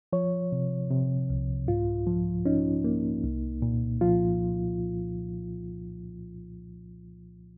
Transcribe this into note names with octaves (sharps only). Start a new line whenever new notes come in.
F3 C#5
C3
C3
C2
G#2 F4
F3
C#4 D#4
A#3
C2
A#2
F3 F4